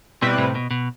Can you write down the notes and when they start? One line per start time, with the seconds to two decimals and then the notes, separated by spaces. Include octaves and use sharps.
0.22 B2 G3 C4 E4 B4
0.38 A2 C3
0.55 B2
0.71 B2